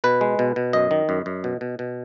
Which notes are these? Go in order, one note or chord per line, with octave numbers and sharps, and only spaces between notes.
B2 B4
G#3
B2
B2
F#2 D#5
D#3
F#2
F#2
B2
B2
B2